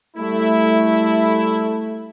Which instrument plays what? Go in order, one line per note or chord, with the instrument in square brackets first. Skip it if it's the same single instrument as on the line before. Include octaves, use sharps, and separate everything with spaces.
[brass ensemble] G3 E4 [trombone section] A3